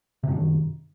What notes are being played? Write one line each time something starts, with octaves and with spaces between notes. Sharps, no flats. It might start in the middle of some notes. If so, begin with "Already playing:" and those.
F#2 C3 D#3